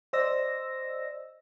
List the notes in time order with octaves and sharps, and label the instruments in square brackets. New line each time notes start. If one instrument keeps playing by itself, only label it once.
[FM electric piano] C5 D5 D#5 E6 A#6